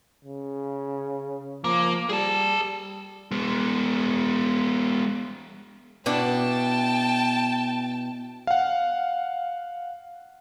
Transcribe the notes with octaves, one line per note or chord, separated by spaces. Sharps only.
C#3
F3 A#3
G3 G#4 A5
G#3 B3
B2 D4 E4 G5 A5
F5 F#5